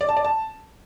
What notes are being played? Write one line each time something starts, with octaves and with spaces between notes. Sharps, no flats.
D5
A5
D5
A5